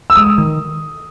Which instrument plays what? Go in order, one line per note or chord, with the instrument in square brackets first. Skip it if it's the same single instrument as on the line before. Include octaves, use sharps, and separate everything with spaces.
[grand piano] E6
[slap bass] G#3 [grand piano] D#6
[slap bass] D#3